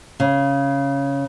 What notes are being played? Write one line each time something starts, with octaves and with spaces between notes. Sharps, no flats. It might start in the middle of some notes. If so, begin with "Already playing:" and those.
C#3